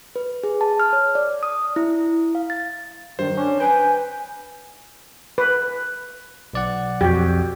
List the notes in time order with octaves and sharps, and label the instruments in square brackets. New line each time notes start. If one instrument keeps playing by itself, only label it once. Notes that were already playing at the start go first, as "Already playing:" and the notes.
[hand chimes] B4
G#4
A5
F6
C#5
D5
D#6
E4
F5
A6
[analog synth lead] G2 [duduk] D#3 [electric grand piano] C5
[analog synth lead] C#4 [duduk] D4
[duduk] B4 [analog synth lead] G5 [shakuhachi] G#5
[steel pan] B4
[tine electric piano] B1 D5 F#5
[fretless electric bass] F2 [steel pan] F#4 G4